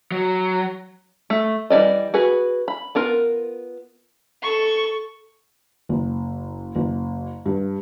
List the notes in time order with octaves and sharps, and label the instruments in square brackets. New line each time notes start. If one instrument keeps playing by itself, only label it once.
[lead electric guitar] F#3
[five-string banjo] A3
E3 G3 E4 D5 D#5
F#4 G#4 B4
B5
B3 F4 A#4
[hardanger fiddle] A4 C#6
[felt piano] F#1
F#1
G2